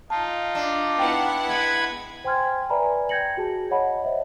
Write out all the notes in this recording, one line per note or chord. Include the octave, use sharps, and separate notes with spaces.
D#4 F4 A5
D4
B3 E4 F#5 G5
G#3 B4 B5 G#6
C5 G5 G#5 C6 F6 G#6
B4 D5 E5 G#5 A#5 B5
G5 G6 G#6 A#6 C#7 F#7
F#4 G#4 A5
C#5 D#5 F#5 A5 B5
C5 D#5 E5 F#5